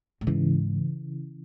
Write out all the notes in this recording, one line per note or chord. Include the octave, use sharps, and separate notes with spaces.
A2
G#2 C#3 E3